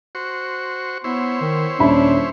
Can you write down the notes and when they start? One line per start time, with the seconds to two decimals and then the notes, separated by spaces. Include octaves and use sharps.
0.15 F#4 C5 C#6
1.04 B3 E4 C5 C#5
1.41 D#3
1.80 D#1 C#4 D4 E5 B5